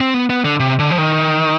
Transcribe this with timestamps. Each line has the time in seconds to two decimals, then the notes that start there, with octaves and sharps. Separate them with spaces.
0.01 C4
0.14 B3
0.30 B3
0.45 D3
0.60 C3
0.79 D3
0.91 F3
0.98 D#3